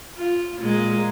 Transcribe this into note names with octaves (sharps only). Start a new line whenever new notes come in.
F4
A#2 G#3